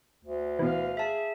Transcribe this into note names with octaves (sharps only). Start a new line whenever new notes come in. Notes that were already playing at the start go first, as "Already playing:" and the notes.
D2
B2 E3 B4 F5
G#4 E5 A5